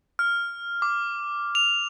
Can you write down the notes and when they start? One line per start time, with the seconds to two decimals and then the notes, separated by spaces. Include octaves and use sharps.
0.19 F6
0.82 D6
1.55 F7